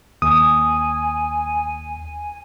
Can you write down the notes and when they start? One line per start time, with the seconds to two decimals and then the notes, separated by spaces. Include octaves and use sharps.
0.22 D#2 G#5 D#6